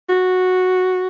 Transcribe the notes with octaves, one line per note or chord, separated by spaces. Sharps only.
F#4